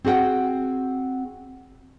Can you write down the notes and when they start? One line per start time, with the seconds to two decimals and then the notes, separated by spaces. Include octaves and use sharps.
0.05 C4 F#4 G#4 F#5 G5